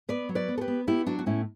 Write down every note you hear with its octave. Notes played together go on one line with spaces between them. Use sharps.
B3 B4 D5
F#3
B4 D5
B3
A4
G4 B4
B3
B3 E4 G4
F#3 D4 F#4
F#4
A2 C#4 E4